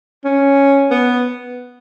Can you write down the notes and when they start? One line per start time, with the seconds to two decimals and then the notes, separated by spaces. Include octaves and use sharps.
0.25 C#4
0.91 B3